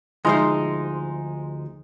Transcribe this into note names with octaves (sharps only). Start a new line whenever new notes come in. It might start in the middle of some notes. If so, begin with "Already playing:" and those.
D2 F3 G#3 D#4 C5 C6